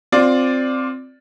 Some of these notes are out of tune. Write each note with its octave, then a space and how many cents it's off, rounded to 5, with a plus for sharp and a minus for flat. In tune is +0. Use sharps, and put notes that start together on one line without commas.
C4 +0 F4 +20 D5 +0